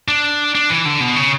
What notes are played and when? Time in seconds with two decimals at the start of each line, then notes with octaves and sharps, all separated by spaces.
0.08 D4
0.55 D4
0.70 E3
0.85 D3
1.00 B2
1.16 C#3